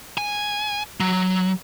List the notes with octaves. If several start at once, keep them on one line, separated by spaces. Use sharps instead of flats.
G#5
F#3